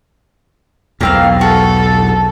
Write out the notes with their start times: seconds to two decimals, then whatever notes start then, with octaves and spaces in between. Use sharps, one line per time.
1.01 B1 E2 G#2 A#3 C4 F5
1.41 F#4 A4